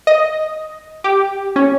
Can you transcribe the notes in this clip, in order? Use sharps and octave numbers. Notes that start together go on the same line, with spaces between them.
D#5
G4
C#4